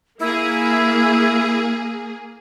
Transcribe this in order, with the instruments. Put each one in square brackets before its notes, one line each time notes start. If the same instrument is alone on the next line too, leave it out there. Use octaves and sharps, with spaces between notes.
[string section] A#3 G#4 [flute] E4